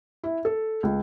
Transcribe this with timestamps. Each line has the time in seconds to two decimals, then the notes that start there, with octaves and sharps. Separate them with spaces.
0.23 E4
0.45 A4
0.83 C#2